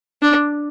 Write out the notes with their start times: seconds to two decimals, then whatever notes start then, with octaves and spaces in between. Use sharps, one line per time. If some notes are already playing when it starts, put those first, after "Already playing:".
0.22 D4